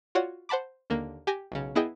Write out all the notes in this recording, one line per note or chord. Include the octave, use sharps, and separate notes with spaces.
F4 F#4 C#5 D5 F#5
C5 F#5 A5 B5 D6
D#2 D3 A#3
G4 G#5 A#6
B1 C#3
B3 E4 G#4 D#5 G5